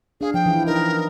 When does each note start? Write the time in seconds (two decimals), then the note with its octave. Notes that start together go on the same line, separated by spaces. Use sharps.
0.21 D4 G#4 F5
0.34 F3 G5
0.46 E3 E4
0.67 D#4 A#4 D#5